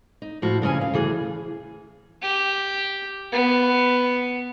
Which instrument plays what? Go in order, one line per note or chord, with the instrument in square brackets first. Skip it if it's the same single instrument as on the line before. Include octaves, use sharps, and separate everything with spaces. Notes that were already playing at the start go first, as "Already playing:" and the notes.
[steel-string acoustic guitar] D#4
A2 F3 F#4
G2 C#3 C#4 G#5
D2 F5
D2 E3 G#4
[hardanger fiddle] G4
B3